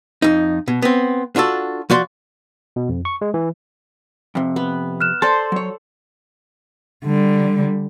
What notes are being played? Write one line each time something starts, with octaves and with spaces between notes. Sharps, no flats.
F2 D#4
B2
B3 C4
D4 F4 F#4 A4
F3 F#4 D5 C6
B2
F2
C#6
G#3
E3
F2 C3
B3
F6 F#6 E7
A4 C5 D5 A5 C6
F#3 C#5
D3 G3